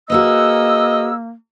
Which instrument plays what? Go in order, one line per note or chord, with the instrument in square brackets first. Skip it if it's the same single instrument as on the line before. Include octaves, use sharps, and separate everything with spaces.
[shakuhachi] A#3 [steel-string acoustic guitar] F#4 G#4 B4 [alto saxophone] D#5 [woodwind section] E6